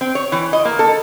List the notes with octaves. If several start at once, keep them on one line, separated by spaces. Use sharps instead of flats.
C4
C#5
E3
D#5
A#3
A4